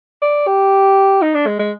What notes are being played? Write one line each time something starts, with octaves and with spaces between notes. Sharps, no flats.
D5
G4
D#4
D4
G#3
G#3